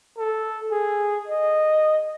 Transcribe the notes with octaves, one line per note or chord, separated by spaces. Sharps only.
A4
G#4
D#5